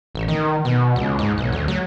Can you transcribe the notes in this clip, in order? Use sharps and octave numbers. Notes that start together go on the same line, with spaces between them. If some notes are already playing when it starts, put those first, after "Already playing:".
A1
D#3
B2
C#2
G#2
B1
D2
F#3